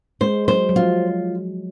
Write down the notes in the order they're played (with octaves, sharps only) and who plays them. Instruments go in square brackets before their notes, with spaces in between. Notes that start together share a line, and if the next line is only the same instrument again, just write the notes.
[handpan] G#3 [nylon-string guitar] C5
[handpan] F#3 [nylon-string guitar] C5
[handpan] F#3
[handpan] F3 [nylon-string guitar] F4